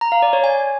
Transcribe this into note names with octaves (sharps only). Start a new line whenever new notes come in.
A#5
F5
D5
C#5
G#5